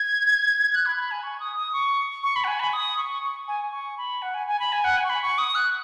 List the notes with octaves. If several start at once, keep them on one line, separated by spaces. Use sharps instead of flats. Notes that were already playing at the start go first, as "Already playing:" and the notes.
Already playing: G#6
F#6
B5
B5
G#5
C#6
D#6
D#6
C#6
C#6
B5
F#5
G#5
B5
D#6
C#6
C#6
G#5
C#6
B5
F#5
G#5
G#5
B5
G#5
F#5
G#5
C#6
B5
C#6
D#6
F#6